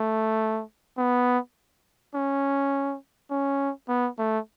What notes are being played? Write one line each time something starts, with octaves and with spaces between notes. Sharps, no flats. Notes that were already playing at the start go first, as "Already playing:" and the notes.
Already playing: A3
B3
C#4
C#4
B3
A3